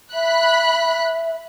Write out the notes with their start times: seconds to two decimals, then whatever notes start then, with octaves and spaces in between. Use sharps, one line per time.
0.14 E5 B5 F#6